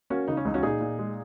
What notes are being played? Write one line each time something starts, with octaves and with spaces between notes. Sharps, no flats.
A#3 C#4 F#4
C#3 D#4
C#4
C#2 D#4
C#4 F#4
A#2 D#4 G#4
A#2
G#3